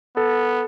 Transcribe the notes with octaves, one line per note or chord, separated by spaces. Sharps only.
B3 A4